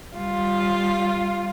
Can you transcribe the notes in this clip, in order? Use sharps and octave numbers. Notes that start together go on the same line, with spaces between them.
G3 F4